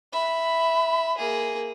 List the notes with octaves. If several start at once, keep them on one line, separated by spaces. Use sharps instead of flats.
E5 B5
A#3 G#4